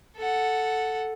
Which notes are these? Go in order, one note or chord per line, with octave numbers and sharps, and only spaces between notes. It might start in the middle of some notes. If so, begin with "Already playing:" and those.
A4 F#5